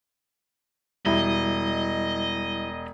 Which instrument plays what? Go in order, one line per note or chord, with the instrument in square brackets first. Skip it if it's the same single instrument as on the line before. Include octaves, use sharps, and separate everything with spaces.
[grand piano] E1 [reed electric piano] G3 E4 [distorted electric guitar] D#5